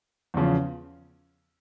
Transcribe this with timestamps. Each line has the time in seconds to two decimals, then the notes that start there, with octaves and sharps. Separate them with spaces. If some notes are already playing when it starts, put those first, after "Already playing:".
0.34 E2 C#3 F3